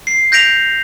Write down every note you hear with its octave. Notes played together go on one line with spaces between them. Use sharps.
C7
G6 A#6 B6 D7 F7